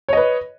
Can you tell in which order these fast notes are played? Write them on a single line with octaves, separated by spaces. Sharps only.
C#5 D#5 B4